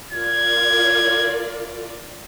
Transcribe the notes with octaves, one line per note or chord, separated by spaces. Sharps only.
F4 A#4 D5 G#6